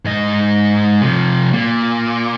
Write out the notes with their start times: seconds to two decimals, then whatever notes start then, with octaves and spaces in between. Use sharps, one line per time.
0.05 G#2 D#5
1.01 C3 F3
1.53 A#2